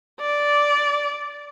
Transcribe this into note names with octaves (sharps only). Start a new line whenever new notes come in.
D5